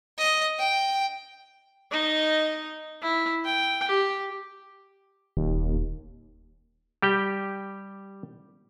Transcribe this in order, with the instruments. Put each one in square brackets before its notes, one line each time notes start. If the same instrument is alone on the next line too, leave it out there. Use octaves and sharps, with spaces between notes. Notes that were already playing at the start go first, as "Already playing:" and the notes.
[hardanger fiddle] D#5
G5
[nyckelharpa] D#4 D#5
E4
G5
G4
[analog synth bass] D#1 [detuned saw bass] D#2
[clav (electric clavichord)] G3 G4 G5